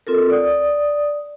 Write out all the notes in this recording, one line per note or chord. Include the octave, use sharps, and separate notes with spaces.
C4 F4 A4 A#4
D5 D#6